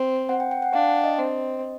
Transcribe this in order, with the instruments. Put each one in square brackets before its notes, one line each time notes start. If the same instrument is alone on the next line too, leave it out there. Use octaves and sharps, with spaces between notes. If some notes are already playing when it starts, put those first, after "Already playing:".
Already playing: [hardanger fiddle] C4
[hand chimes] F#5
G5
G5
F#5
[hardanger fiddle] D4 [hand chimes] F5
[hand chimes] G5
D#5
[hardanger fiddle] C4